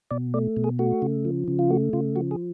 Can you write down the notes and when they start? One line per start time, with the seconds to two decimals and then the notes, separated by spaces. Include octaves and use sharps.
0.11 B2 D5
0.34 A3 D5
0.57 B2
0.64 G#4
0.79 A3 F#4
1.02 C#3
1.25 F3
1.48 C#3
1.59 F4
1.70 A3 F#4
1.93 C#3 F4
2.16 F3 F#4
2.31 G#4